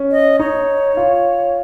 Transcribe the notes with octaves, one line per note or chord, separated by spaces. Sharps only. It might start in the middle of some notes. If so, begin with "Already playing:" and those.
Already playing: C#4
D#5
D#4 C#5
F4